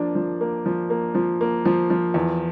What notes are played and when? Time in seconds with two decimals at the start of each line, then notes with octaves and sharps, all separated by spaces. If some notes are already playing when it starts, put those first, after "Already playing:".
Already playing: F3 A#3 D4
0.15 F3
0.41 A#3
0.66 F3
0.90 A#3
1.15 F3
1.41 A#3
1.65 F3
1.90 F3
2.14 E2